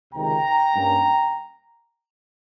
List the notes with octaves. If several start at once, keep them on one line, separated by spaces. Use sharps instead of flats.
C#2 C3 D#3 G5 A#5
G2 G3 A#3 C#4